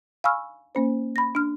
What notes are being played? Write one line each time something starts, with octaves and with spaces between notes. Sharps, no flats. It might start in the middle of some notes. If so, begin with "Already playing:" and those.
F5 G#5 B5 C#6 E6 F6
A#3 C#4 C5
B5 A#6
D4 F6